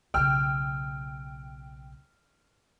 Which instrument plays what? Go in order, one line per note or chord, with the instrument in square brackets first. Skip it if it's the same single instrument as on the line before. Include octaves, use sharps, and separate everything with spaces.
[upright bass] B1 C#3 [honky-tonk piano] G5 E6 F6